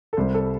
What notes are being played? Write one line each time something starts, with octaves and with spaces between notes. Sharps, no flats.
A4
C2 C3 G3 C5
A4